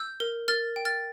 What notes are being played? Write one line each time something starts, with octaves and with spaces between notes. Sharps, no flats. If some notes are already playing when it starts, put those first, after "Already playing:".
Already playing: E6 G6
A#4
A#4 F6 A6
G5
F6 A6